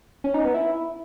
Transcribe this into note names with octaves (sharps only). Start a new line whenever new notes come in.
C#4
D#4
B3
E4